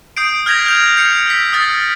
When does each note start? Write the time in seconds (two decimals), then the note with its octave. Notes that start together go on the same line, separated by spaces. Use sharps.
0.17 D#6 G6 C7 D7
0.46 F6 G6 G#6 A#6 B6 F7
0.66 F6 G6 F7
0.97 G6 C7 C#7 F7
1.26 E6 B6
1.53 D#6 F6 A6